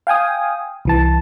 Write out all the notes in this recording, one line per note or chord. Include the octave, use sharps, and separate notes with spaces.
F5 G5 G#5 D#6
C2 E3 A5